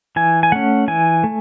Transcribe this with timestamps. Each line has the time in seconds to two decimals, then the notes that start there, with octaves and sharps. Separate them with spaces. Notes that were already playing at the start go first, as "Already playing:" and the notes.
0.16 E3 G#5
0.43 G#5
0.52 A3 C#4 F#5
0.88 E3 G#5
1.24 A3